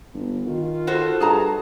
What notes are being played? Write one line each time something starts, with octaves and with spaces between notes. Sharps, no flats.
G1
D#3 F4
F#4 A4 C5
G2 G#4 A5 A#5